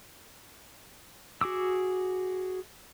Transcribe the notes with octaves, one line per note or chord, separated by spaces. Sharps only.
F#4 G#4 D6 E6